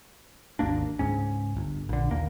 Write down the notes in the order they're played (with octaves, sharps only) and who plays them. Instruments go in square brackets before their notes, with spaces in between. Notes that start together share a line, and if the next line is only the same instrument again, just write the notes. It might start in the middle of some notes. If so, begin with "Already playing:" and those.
[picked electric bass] G#1 D#2 A#3 D4
C#2 G#2 C#4
G1
A#1 D3
D#2 A#3